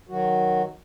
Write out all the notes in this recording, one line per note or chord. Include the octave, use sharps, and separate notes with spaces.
D#3 F#3 F#4